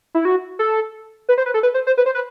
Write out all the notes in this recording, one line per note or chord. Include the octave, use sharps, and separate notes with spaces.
E4
F#4
A4
B4
C5
B4
A4
B4
C5
C5
B4
C5
B4